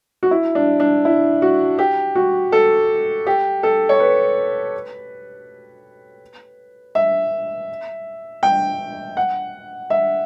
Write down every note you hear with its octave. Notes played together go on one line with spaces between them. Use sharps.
F#4
E4
D4
D4
E4
F#4
G4
F#4
A4
G4
A4
C#5
B4
E5
G5
F#5
E5